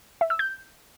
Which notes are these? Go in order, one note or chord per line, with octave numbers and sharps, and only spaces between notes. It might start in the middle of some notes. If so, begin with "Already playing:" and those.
E5
E6
G6